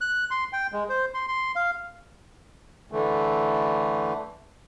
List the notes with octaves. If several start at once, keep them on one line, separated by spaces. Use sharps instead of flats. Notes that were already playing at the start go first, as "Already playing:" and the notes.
F#6
C6
G5
G#3
C5
C6
C6
F5
D3 E3 A3